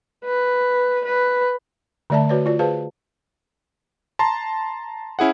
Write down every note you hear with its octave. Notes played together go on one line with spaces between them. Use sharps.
B4
B4
D3 A3 D5 E5 A5
F#4 B4 C#5 D5
F4 D5
G#4 B4 C5 F5 A5
A5 A#5 C6
C#4 E4 G#4 F#5